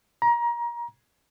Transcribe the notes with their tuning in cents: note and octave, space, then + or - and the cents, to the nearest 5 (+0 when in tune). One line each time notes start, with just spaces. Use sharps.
A#5 +25